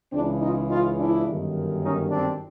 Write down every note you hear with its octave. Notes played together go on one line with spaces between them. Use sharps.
C#2 C#3 E3 C4 D4
D#4 F4
D#4 F4
D4 E4
G1 F#2 D#3
C#4 D#4
C4 D4